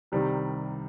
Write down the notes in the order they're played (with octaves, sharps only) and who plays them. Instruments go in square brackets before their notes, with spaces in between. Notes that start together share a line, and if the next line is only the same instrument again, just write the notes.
[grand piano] C2 C3 D#3 G3